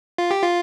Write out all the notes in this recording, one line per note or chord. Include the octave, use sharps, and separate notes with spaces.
F4
G4
F4